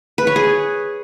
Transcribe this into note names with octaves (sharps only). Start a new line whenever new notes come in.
B4
C#5
G#4